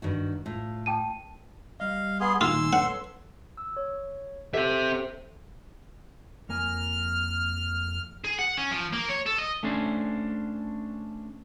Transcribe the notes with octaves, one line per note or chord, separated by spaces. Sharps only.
G2 D#3 F#4
A2 F4
G5 A5 D#7
G3 D#5 F5
B3 G#4 C6
A#2 D#3 F4 G#5 C6 E6
A4 B4 C#5 F#5
E6
C#5
C4 G4 A4 C5 E5
F2 A#3 G#5 F6
G#4
F#5
C#4
F3
A#3
C#5
A4
D#5
A3 C#4 D4 C5